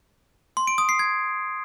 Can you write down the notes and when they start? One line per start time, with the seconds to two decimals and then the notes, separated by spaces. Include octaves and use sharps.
0.57 C6
0.67 D7
0.78 D#6
0.89 C7
0.99 G#6